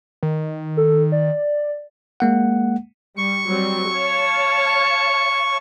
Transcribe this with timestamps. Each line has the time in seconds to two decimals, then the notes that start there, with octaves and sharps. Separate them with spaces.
0.23 D#3
0.77 A4
1.12 D5
2.20 G#3 A#3 F#5
3.17 G3 C#6
3.46 F#3 G3 C4
3.90 C#5 F5 A5